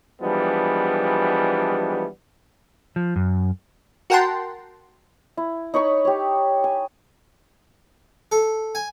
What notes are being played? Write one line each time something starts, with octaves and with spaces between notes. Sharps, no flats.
E3 F3 G3 G#3 B3 D4
F3
F#2
F#4 A#4 F#5 G5 A5 C6
E4
D#4 C#5 B5 C#6
G4 C#5
G#5
A4
G#5